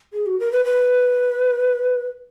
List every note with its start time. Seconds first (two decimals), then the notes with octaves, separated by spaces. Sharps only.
0.13 G#4
0.26 F#4
0.40 A#4
0.52 B4
0.65 B4